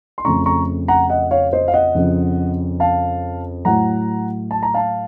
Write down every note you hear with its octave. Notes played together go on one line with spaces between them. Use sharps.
C6
F2 C#3 A3 A#5 C#6
A#5 C#6
F#5 A#5
D#5 F#5
C#5 F5
C5 D#5
F5
D#5 F#5
F2 C#3 F3
F5 A5
A2 F#3 A3 F#5 A#5
A5
A#5
F5 A5